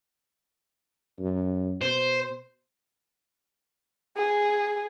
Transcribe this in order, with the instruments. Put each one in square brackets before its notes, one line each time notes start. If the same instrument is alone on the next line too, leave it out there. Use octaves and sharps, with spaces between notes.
[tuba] F#2
[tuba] B2 [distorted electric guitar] C5
[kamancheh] G#4